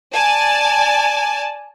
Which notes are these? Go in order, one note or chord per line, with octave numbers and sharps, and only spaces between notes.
D5 G#5 A5